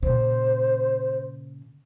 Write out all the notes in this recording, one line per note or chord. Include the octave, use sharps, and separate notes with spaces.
A#2 C#3 C5